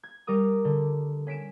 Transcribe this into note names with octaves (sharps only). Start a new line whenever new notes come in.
G#6
G3 A#4 D6 D#6
D3
C#4 B6 D7 E7